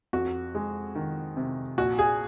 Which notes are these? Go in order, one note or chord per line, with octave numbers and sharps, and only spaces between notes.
F2 F#4
G#3
D#3
C3
A#1 F#4
G#4